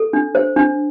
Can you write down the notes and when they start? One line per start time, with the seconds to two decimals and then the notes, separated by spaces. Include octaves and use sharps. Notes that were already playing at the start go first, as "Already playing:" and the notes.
Already playing: A4
0.13 D4
0.35 C5
0.56 D4